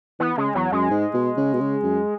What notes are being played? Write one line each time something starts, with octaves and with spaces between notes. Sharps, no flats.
E3 B3
C#3 G#3
E2 F#3
F#2 G#3
G#2
B2
C#3
B2
C#3
F#2